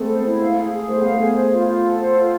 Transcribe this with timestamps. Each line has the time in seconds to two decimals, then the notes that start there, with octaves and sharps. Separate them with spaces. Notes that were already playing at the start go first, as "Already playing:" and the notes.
Already playing: G#3 A3 B3 C4 A4
0.09 C5
0.25 E4
0.41 F5
0.57 G#4
0.72 G#4
0.89 A3 C5
1.02 B3 F5
1.13 A3
1.20 G#4
1.36 C5
1.52 F4
1.67 F4
1.84 A4
1.99 C5
2.15 F4